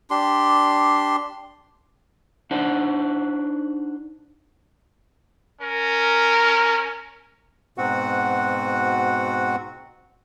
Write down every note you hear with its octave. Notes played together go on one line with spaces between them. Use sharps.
D4 G4 C6
D4 D#4 C5 F#5 A5
C#4 A#4
G#2 B2 C4 F#4 F#5